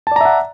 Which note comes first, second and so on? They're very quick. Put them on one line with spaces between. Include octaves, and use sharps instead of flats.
A5 D5 A#5 E5 F#5